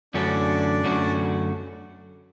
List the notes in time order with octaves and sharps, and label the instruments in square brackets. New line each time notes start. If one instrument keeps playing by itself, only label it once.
[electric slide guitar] F#2 D3 A3 C#4 F#4 [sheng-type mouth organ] D4 D5
[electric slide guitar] F#2 D3 A3 C#4 F#4